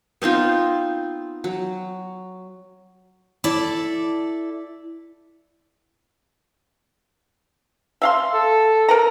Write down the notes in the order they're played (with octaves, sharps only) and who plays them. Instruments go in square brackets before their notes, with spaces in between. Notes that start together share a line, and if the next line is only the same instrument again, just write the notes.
[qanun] B3 C4 D#4 F4
F#3
[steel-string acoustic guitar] E4 A4 D5
[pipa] E5 F5 C6
[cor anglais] A4
[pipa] A#4 B4 A#5